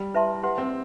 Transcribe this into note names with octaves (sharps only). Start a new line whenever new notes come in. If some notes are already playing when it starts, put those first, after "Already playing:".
Already playing: G3
E4 B4 E5 A5 C6
G4 B4 F#5 C6
C4